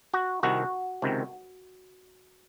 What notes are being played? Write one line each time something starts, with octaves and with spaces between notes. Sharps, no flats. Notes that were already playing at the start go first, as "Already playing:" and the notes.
F#4
C2 C3 D#3 F#4
C#2 C3 D#3